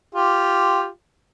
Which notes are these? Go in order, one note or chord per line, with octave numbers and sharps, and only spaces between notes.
F4 G4